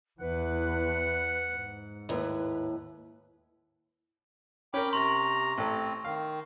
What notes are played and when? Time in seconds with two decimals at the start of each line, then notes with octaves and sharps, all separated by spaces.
0.20 E2 E3 B4 F#5
1.51 G#2
2.09 D#2 A2 B4
4.74 C#4 A#4 G5 B5 D6
4.93 C3 A#5 C6 C#6 A#6
5.58 A1 C4 A4
6.04 D#3 F5